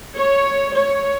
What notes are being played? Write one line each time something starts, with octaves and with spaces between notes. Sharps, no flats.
C#5
C#5